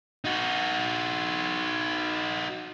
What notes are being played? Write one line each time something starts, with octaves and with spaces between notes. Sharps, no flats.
D#4 F#4